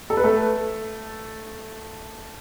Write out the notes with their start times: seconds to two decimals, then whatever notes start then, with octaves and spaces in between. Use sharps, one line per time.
0.10 A4
0.17 B4
0.24 A3 A4